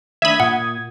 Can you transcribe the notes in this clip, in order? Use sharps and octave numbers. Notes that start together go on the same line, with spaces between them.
D#3 A3 D4 E5 B5 D#6 G#6
A#2 F#5